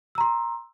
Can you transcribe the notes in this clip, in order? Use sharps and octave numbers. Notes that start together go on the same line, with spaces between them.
A#5 C6 E6